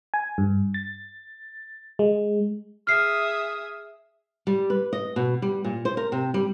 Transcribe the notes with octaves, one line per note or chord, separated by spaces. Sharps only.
G#5
G2
A6
G#3
G#4 E5 D#6 F6 C7
G3
B4
D#5
B2
G3
A#2
C5
A#4
C3
G3